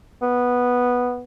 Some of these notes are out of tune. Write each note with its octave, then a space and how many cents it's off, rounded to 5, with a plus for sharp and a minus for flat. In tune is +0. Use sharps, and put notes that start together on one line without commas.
B3 -5